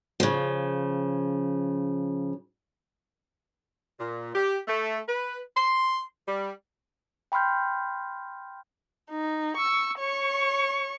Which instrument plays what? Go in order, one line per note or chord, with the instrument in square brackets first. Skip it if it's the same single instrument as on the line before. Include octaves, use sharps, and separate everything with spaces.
[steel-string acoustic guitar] C#3 F3
[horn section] A#2
G4
A3
B4
C6
G3
[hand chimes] G5 B5 C6 F6 G6
[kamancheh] D#4
C#6 E6
C#5 C#6